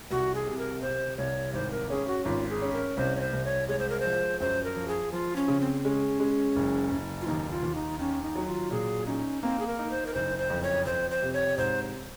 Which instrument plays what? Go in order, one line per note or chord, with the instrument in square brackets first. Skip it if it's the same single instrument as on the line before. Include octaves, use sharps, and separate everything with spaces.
[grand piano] C2 [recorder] F#4
[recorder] G#4
[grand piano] C3
[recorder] A#4
[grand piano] C3 [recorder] C5
[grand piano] C2 [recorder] C#5
[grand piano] G#1 [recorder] C5
[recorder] A#4
[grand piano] C#4 [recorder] G#4
[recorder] F#4
[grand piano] G#1 [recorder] F4
[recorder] G#4
[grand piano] C#4
[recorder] A#4
[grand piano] C2 [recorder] C5
[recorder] C#5
C5
[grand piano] C2
[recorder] C#5
[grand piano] G#3 [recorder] C#5
[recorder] C5
A#4
C5
[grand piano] F3
[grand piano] F#2 [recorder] C5
[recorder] A#4
[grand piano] F3
[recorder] G#4
[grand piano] F3 [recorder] F4
[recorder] C#4
[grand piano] C#3
[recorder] C4
[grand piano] G#3 [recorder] C#4
[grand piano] G#3
F#1
F#1
[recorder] F4
[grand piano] D#2 [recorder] D#4
[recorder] F4
[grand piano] D#2
[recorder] D#4
[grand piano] D#3 [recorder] C#4
[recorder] D#4
[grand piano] F#3
[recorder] F4
[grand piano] A#2 [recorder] G#4
[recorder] C#4 [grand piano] D#4
[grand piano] A#3 [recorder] C4
[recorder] G#4
A#4
[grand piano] D#4
[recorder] C5
A#4
[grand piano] F#1 [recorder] C5
[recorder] C5
[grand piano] F2
[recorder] C#5
[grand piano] F2 [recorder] C5
[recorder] C5
[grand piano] C3
[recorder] C#5
[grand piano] G#2 [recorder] C5